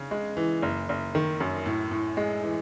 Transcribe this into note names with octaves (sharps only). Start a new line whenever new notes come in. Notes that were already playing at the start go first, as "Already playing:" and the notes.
Already playing: C#3
G#3
E3
F#1
F#1
D#3
F#2
A2
A2
G#3
E3